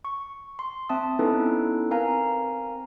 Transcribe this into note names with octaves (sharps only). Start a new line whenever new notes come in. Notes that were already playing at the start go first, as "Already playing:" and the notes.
C#6
C6
C4 E5 A5 D#6
B3 C#4 D#4 E4 A4 B4
C4 A#4 F5 G#5 A#5